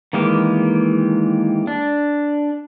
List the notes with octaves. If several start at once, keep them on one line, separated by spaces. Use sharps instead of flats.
D#3 E3 G#3 A#3 G4
D4